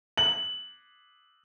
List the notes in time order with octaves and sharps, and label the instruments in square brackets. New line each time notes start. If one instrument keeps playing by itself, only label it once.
[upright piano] F#7